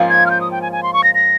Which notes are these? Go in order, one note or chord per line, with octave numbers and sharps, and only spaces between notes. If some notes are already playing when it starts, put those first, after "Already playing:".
Already playing: G#2 F3 A#3 C#4 F4
G#6
F6
G6
D#6
G5
G#5
G#5
C6
C#6
A#6
A#6